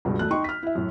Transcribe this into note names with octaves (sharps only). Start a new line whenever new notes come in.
C#2 G2 B2
E1 A3 F#6
D#4 G5 C6 C#6
F6 B6
E4 E5
F#2 A2